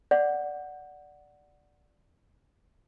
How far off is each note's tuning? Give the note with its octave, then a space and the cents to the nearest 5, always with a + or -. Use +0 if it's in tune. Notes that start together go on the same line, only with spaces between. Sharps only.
D5 +0 F#5 +0